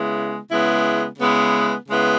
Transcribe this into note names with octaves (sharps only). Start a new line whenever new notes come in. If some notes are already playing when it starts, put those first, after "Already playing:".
Already playing: C#3 G#3 B3 E4
C#3 G#3 B3 E4
C#3 G#3 B3 E4
C#3 G#3 B3 E4